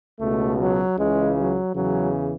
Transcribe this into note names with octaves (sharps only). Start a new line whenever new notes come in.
C#2 B2 A3
F#3
C#2 C#3 E3 G#3
F#3
E2 C#3 E3 F#3